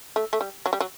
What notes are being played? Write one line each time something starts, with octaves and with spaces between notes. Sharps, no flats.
A3
A3
G3
F#3
G3
F#3